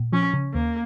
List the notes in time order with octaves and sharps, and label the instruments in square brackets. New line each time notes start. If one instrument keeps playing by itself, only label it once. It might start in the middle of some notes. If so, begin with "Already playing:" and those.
Already playing: [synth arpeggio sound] A#2
[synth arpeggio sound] F3 [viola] C#4
[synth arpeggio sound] C#3
[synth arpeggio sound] D#2 [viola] A#3